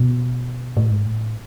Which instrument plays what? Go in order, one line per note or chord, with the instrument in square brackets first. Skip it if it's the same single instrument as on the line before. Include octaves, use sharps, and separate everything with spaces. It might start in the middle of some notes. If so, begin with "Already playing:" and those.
Already playing: [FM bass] B2
A2
G#2
A2